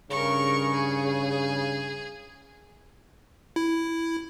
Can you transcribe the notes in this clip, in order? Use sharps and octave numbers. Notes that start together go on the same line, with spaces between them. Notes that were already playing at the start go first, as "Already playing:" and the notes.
G2 C#3 A#4 C#6
G#4
E4